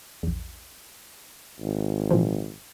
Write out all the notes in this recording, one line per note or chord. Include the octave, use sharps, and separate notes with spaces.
A#1 E2
G#1
A#2 E3 F3